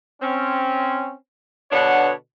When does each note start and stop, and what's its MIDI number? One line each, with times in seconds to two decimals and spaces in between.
0.22 1.14 60
0.22 1.14 61
1.72 2.12 47
1.72 2.12 50
1.72 2.12 59
1.72 2.12 62
1.72 2.12 73
1.72 2.12 78